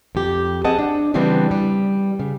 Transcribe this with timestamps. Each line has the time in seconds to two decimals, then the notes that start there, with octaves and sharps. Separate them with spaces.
0.15 F2 G4
0.64 C4 G#4 D#5 F#5 A5
0.79 D4
1.14 C#3 E3 G3 B3 C4 D4
1.51 G3
2.20 C#3